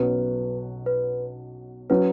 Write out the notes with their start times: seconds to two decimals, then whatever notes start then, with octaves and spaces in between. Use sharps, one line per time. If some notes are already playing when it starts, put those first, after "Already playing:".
Already playing: B1 B2 F#3 C#4 F#4 B4
0.86 B4
1.90 F#3 C#4 F#4 B4